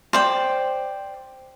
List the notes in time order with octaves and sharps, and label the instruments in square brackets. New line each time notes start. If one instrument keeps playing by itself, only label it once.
[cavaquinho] C5 D5 G5